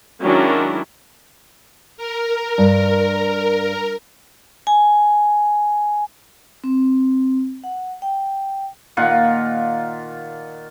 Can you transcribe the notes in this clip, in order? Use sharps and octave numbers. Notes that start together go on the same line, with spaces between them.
D#3 F#3 G#3 C#4 D4 E4
A#4
G2
G#5
C4
F#5
G5
A#2 D#3 F4 F#5